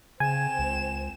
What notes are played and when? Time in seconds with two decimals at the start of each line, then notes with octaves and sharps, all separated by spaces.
0.20 C#3 C4 G#5 E7
0.59 C#2